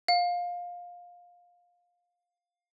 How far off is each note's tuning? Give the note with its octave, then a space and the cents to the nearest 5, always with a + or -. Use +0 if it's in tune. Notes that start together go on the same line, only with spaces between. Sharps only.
F5 +15